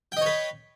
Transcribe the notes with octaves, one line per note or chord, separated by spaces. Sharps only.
B4 C#5 D#5 G5